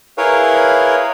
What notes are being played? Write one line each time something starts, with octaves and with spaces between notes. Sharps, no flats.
E4 G#4 A#4 B4 C#5 F5